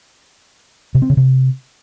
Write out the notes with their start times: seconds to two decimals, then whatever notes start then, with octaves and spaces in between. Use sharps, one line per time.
0.95 C3
1.02 C4
1.10 C#3
1.17 C3